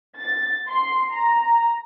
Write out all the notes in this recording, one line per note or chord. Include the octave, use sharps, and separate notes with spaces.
A6
C6
A#5